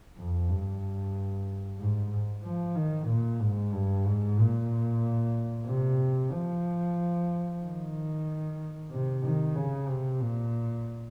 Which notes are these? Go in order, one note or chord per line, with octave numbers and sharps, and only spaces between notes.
F2
G2
G#2
F3
D#3
A#2
G#2
G2
G#2
A#2
C3
F3
D#3
C3
D#3
C#3
C3
A#2